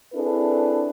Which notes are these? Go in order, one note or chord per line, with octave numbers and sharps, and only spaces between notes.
C4 D4 E4 G#4 A4 B4